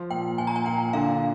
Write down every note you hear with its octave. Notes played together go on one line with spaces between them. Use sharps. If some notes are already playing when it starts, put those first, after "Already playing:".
Already playing: F3
A#2 G5
A#2 G#5
A#5
G#5
A#2 G5
D3 F5